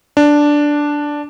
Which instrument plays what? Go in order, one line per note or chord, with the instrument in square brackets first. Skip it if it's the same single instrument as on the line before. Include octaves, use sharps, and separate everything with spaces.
[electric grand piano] D4